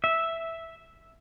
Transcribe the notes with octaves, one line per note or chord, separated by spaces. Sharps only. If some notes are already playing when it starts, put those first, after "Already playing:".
E5